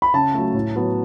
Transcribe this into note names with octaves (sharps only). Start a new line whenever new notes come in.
B5
C#3 A5
F#3 A3
A2
F#3 B3